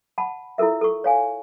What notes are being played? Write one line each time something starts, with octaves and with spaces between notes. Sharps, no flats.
F#5 A5 B5
E4 F4 A4 A#4 E5
A4 C#6
C#5 F5 G#5